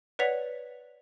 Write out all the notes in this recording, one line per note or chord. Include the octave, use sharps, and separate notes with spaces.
B4 C#5 D5 F#5 B6 F7